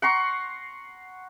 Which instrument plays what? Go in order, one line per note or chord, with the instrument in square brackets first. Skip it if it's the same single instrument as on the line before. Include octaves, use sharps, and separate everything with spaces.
[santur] F#5 A#5 C6 C#6